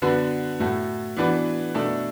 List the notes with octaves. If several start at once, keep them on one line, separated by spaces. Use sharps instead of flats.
D3 B3 D4 F#4 B4
A2 A3 F#4 A4
E3 B3 D4 F#4 B4
B2 A3 D4 A4